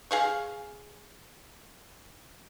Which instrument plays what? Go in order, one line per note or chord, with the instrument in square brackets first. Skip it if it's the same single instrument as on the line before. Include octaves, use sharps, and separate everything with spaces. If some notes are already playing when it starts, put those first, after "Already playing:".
[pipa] G#4 F5 C#6